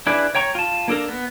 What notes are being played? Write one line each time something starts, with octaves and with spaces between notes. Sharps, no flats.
D4 E4 G#4 B4 D5
C#5 G5 A#5 C#6
F4 A5
A#3 D4 A4 A#4
B3